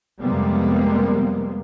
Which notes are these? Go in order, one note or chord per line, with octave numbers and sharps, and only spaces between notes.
F2 C3 G3 G#3 A#3 B3